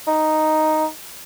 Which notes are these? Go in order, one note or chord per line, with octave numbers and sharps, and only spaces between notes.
D#4